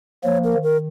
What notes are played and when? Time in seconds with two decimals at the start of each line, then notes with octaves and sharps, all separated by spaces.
0.24 F3 A#3 C#5
0.44 A#4
0.54 D#3
0.63 A#4